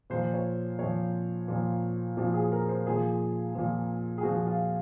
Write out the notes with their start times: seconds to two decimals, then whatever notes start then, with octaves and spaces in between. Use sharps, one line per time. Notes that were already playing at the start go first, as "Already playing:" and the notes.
0.10 A#2 F3 C5
0.34 C#5
0.79 A#2 F3 C#5
1.48 A#2 F3
2.17 A#2 F3 F#4
2.34 G#4
2.52 A#4
2.69 C5
2.86 A#2 F3 G#4
3.55 A#2 F3
4.18 G#4
4.23 A#2 F3 F#4
4.46 F4